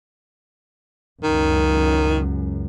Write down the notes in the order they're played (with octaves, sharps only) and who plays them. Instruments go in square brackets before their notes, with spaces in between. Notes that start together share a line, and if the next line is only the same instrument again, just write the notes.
[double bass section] C#2 F#2 [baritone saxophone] D#3